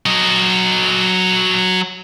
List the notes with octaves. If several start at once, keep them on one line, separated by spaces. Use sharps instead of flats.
F#3 D#5